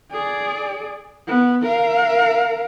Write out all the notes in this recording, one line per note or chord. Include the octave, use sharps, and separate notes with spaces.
G#4 D5
B3
A#4 F5